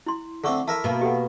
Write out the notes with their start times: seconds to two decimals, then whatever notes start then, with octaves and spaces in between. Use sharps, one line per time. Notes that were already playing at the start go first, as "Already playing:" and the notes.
0.06 E4 C6
0.44 D3 A3 C4 A4 C#6 D6
0.68 E4 A#4 E5 A5
0.84 B2 A#3
1.01 G4 A4 F#5